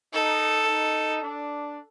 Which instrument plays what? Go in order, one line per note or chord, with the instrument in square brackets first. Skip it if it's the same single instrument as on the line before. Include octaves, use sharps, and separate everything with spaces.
[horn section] D#4 [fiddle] A4
[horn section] D#4
D4